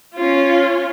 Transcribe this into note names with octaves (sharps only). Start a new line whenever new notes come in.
C#4 F4